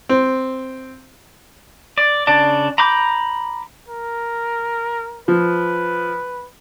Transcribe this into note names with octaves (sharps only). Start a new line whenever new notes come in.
C4
D5
C#3 D4 D5 A5
A#5 B5 D6 G6
A#4
F3 B4